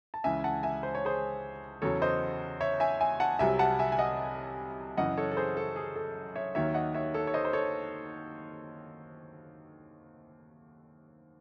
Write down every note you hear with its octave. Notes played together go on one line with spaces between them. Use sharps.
A5
C#2 C#3 E3 E5 G#5
F#5 A5
E5 G#5
C5
C#5
G#4 C5
E2 C#3 F#3 A4 C#5
C5 D#5
C#5 E5
E5 G#5
E5 G#5
F#5 A5
C2 C3 F#3 E5 G#5
F#5 A5
E5 G#5
G#5
D#5 F#5
F#2 C#3 E3 D#5 F#5
A4 C#5
A4
G#4 C5
A4
G#4
A4
C#5 E5
D#2 D#3 F#3 C#5 E5
D#5 F#5
C#5 E5
A4 C#5
C#5
C5 D#5
C5
A4 C#5